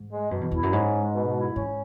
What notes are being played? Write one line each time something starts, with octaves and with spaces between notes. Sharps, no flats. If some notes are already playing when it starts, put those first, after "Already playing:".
Already playing: G#2
G#3
F#2 B2
E2
E2 E4
F#2
G#2 C#4
G#3
B2
E4
G#2 C#4